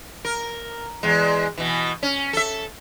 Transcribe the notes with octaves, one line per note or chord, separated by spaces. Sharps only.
A#4
E2 G#3
B2 E3
C#4
A4 E5